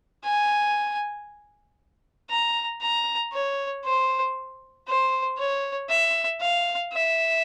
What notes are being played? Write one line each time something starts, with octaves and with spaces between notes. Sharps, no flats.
G#5
A#5
A#5
C#5
C5
C5
C#5
E5
F5
E5